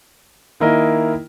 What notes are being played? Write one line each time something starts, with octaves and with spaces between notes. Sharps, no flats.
D#3 A#3 E4 A#4 D#5